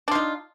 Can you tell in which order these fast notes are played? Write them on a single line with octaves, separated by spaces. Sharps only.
D4 F4 D#4